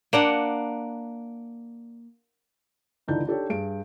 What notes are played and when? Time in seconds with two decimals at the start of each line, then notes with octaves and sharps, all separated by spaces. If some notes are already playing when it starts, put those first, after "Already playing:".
0.13 A#3 D4 F#5
3.08 C#2 D3 E3 D4 D#4 G6
3.27 D4 D#4 G4 A4 C#5
3.49 G2 G#4 D7